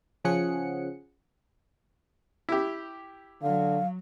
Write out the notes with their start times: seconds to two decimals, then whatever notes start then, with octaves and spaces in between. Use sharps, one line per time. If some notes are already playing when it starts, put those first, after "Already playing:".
0.24 C#3 F3 C#4 G#4 F#5 C#7
2.49 E4 G4
3.42 D3 F#3 F5